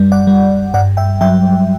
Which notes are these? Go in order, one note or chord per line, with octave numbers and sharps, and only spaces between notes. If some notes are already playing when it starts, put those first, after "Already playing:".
Already playing: F#2 G3
D5 F#5
G3
G2 D5 F#5
E5 G5
F#3 E5 G5